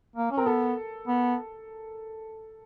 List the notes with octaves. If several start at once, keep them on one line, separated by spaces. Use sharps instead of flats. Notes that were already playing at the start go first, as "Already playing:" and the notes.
A#3
C#4
C4 A#4
B3 A4
B3